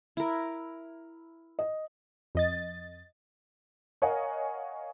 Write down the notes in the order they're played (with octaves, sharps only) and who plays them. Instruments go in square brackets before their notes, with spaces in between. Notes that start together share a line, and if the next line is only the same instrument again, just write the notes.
[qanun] E4 A#4
[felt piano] D#5
[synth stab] F2 D#5 A6
[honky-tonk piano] A#4 C#5 D#5 F5 F#5 G#5